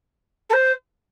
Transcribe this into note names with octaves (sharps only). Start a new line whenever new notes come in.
A4
C5